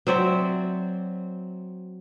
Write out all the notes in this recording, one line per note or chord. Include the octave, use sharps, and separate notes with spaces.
F#3 C4 D5 E5